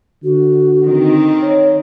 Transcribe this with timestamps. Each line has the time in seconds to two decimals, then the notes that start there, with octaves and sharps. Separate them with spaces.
0.23 D3 F#4
0.85 D#3 C4
1.42 C#5